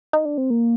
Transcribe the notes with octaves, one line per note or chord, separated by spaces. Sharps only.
D#4
D4
C4
A#3